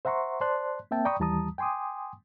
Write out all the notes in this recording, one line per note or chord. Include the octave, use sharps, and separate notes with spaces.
C5 E5 F#5 A#5 C6 C#6
C5 D5 A5 C6 F#6
A#3 C4 E5 G5 A5
D5 G5 A#5 B5 C#6 D#6
D#2 E3 G3 A5 A#5 D#6
G5 G#5 C6 D6 D#6